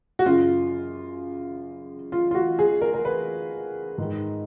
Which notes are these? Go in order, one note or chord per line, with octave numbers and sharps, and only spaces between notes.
F#4
F#2 C#3 F4
F4
F4
F#4
G#4
A#4
A#4
B4
G#2 D#3